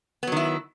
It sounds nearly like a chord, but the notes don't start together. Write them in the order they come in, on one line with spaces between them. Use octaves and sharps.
B3 F#3 D#3 E4